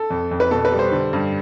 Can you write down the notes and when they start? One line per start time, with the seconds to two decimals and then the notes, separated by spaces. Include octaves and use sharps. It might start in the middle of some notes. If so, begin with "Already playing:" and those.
Already playing: A4
0.10 F2
0.31 F2
0.40 B4
0.51 B2 A4
0.65 B4
0.72 G3
0.79 C5
0.92 D3
1.13 G2